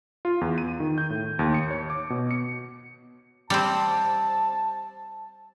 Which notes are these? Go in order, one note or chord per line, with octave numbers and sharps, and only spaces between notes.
F4
E2
D#7
D#3
G6
A2
D#2
C#7
C#5
D6
B2
C#7
G3 C4 A5